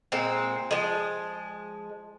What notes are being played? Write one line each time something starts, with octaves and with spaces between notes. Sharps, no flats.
A#2 G#3 C4
F3 G#3